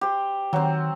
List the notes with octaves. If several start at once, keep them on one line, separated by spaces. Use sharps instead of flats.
G4 C5
D#3 F#3 C4